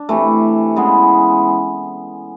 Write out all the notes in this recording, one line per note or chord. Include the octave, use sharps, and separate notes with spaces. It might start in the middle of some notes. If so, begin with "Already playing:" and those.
Already playing: D4
C3 E3 A3
C#3 E3 G#3 B3